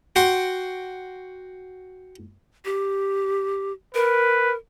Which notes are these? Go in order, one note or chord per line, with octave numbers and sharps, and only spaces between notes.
F#4 G5 C6 D6
G4
A#4 B4